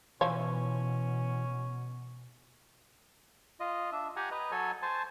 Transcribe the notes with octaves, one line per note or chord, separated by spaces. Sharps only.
B2 E3 F3 C#4 C#5
F4 D#5
D4 E5
G4 F#5 G#5 A#5
B4 D#5 A#5
F#3 A4 C#5 G#5
C5 G#5 A5